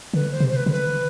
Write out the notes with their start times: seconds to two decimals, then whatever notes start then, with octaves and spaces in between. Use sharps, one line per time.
0.13 D3 B4
0.31 C5
0.40 C3
0.49 C5
0.56 B4
0.66 D3
0.72 B4